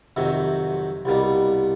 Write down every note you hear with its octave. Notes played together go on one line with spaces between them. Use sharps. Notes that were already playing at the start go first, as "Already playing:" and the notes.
F2 C3 D#3 F#3 E5
C2 B2 G3 A#3